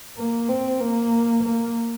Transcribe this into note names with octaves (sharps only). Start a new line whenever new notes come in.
A#3
C4
A#3
A#3